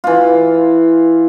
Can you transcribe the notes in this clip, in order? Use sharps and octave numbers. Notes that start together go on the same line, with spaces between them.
E3 F4